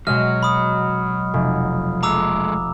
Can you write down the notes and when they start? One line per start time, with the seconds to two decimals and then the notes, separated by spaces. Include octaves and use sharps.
0.07 B2 F#3 G#3 D#5 F6
0.43 B5 D#6
1.34 F1
2.03 G#3 A4 A#5 D6 E6